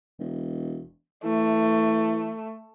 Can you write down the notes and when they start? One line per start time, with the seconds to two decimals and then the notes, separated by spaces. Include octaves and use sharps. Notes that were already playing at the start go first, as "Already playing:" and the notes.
0.19 E1
1.24 E3 A3